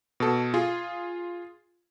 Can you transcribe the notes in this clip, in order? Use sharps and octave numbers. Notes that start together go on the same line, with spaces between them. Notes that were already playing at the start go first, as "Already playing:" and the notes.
B2 A4
F4 G#4